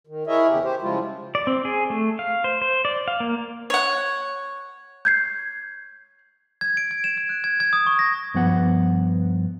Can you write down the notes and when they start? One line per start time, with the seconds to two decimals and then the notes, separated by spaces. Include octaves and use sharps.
0.07 D#3
0.27 E4 G#4 A#4 C#5 D#5 E5
0.48 E2 C#3 G4
0.64 G4 C5
0.82 C#3 F3 G3 G#3 E4 F4
1.35 D5
1.47 C4
1.65 G#4
1.90 A3
2.19 F5
2.44 C5
2.62 C5
2.85 D5
3.08 F5
3.20 A#3
3.70 C#5 F#5
5.05 G6 G#6 C7
6.61 G#6
6.77 D7
6.91 G#6
7.04 E7
7.18 G#6
7.29 F#6
7.44 G#6
7.60 G#6
7.73 D#6
7.87 C#6
7.99 A#6
8.34 G2 F3 B3 F#5